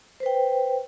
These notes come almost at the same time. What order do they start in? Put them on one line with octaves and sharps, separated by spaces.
C5 B4 G5